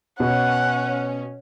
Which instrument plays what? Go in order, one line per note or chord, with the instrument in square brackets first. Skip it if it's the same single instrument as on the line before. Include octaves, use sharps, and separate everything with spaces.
[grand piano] B2 [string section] C#4 [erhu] F#5